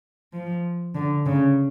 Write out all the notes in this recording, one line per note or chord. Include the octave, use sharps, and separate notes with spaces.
F3
D3
C#3